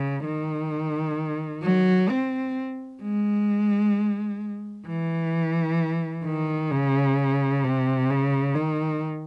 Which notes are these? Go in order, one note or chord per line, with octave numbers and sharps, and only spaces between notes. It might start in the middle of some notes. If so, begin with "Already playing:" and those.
Already playing: C#3
D#3
F#3
C4
G#3
E3
D#3
C#3
C3
C#3
D#3